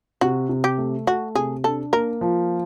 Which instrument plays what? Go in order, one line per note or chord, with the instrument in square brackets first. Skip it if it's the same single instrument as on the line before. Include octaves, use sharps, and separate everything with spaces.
[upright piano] C3 [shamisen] F#4
[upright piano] C3
[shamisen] G4
[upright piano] A3
[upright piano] A3 [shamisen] F#4
[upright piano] C3 [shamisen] G#4
[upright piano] D4 [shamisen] A4
[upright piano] A#3 [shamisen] A#4
[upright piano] F3